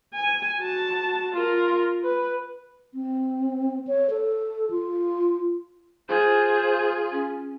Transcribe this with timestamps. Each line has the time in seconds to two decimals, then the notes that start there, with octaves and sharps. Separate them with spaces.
0.15 G#5
0.60 F#4 A5
1.33 F4 A#4
2.04 B4
2.94 C4
3.87 C#5
4.10 A4
4.71 F4
6.09 F4 G#4 C5
7.11 C#4